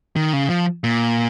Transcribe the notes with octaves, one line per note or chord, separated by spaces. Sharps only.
D#3
C#3
F3
A#2